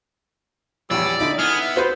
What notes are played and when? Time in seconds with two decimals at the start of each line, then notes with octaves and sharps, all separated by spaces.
0.90 A#1 E2 G3 C#4 D5 E6
1.19 D3 D#4 E4 B5
1.39 B3 G#4 D#6 F6
1.61 E5
1.76 F#4 B4 C5 B5